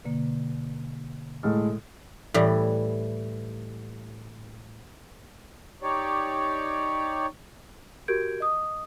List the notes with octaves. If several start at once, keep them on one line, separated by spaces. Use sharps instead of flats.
B2 D3 A#3
A2 G#3 A4 F6
A2 E3 G3
D#4 G4 C#5 D5
F#4 G4 A#4 G6 G#6 D7
D#5 D#6